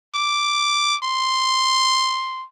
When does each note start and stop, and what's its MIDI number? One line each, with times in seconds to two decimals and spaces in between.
0.15 0.96 86
1.03 2.45 84